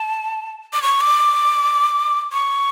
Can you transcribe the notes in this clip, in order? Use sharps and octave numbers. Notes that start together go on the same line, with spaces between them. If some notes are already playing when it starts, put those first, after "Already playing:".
Already playing: A5
D6
C#6
D6
C#6